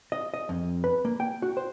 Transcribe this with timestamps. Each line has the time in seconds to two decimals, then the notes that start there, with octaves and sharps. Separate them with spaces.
0.12 D#5
0.34 D#5
0.49 F2
0.84 B4
1.05 A#3
1.20 G5
1.42 F#4
1.57 C5